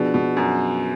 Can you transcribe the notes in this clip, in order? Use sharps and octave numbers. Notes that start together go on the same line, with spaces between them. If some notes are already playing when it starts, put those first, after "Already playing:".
Already playing: B2 F3 B3 D4 G#4 D5
B2
F#2